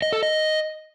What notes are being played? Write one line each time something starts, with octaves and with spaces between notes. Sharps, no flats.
D#5
A4
D#5